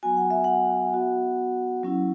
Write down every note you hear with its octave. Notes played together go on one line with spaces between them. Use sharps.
F#3 B3 F#4 G#5
F#5
E5
F#5
B3 F#4
F#3 C#4 E4